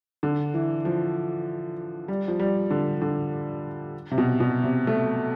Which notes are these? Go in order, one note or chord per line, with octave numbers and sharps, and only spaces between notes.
D3
E3
F3
G3
F3
G3
D3
D3
C3
B2
B2
C3
A3